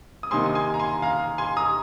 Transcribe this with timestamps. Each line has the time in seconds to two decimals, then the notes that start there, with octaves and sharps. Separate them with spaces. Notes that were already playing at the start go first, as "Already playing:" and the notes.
0.23 D#6
0.31 C3 D#3 A#3 D#4 G#5 C6
0.46 D#6
0.55 G#5 C6
0.74 A#5
0.79 G#5 C6
1.02 F5 A#5
1.38 G#5 C6
1.57 A#5 D#6